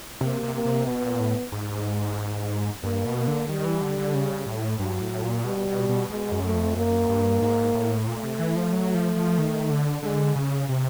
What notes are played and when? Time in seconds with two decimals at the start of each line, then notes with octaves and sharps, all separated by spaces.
0.21 C3 A#3
0.43 C3
0.54 A#3
0.65 C3
0.87 B2 B3
1.03 A#2
1.20 A2
1.52 G#2
2.83 G2 A#3
3.05 B2
3.16 A#3
3.27 D3
3.48 D#3 G3
3.64 E3
3.81 D3
3.98 D3
4.14 C#3
4.46 A2
4.79 G2 F#3
5.01 A2
5.23 A#2
5.44 B2 G3
5.67 B2
5.89 B2
6.10 B2 G#3
6.32 F#2
6.43 A3
6.54 F2
6.76 F#2 A#3
7.09 G2
7.42 G#2
7.75 A2
8.07 A#2 A3
8.23 C3
8.39 E3
8.56 F3
8.73 F#3
8.95 F3
9.16 F3
9.38 D#3
9.70 D3
10.03 D3 G#3
10.36 C#3
10.69 C3